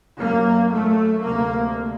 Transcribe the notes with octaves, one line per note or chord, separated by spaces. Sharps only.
F#2 A#3
A3
D2 C3 A#3